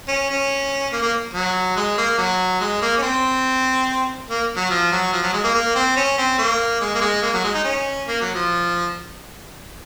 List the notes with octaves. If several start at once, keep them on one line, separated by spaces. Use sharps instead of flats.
C#4
C#4
A#3
A#3
F#3
G#3
A#3
F#3
G#3
A#3
C#4
C4
A#3
F#3
F3
F#3
F3
F#3
G#3
A#3
A#3
C4
C#4
C4
A#3
G#3
A#3
G#3
A#3
F#3
G#3
D#4
C#4
A#3
F#3
F3